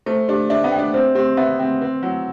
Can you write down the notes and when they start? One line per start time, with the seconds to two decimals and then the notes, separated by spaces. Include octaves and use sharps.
0.06 A3 C5
0.28 D4 G4
0.50 D4 E5
0.64 B3
0.72 G5
0.79 D4
0.94 C4 C5
1.15 C4 G4
1.37 B3 E5
1.59 C4 G5
1.81 C4 B4
2.02 F#3 E4